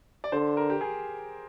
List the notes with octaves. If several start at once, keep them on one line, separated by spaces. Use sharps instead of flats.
D5
D3 C5
A#4
G4
G#4